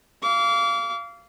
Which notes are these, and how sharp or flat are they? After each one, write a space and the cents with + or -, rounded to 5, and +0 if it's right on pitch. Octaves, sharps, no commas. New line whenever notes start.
F5 -15 D6 -35